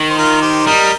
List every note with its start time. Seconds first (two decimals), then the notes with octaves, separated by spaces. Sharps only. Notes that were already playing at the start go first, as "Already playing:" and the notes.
Already playing: D#3
0.10 C5
0.18 F4 A#4
0.42 G4 C5
0.66 G3 A#4 D#5